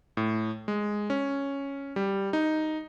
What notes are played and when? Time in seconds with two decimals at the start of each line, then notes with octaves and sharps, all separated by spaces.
0.17 A2
0.68 G#3
1.10 C#4
1.96 G3
2.33 D#4